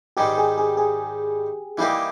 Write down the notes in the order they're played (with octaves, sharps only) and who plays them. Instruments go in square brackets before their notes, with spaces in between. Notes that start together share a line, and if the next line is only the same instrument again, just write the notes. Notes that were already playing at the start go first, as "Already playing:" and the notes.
[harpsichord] G#2 D#3 G3 [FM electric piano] G4
[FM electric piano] G#4
G#4
G#4
[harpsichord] E3 G3 A#3 D#4 G4 [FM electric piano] E4